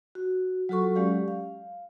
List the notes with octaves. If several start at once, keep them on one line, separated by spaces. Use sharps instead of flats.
F#4
F#3 F4 F#4 A4 C#6
F#3 G#3 C#4 G4 D5 F5
F5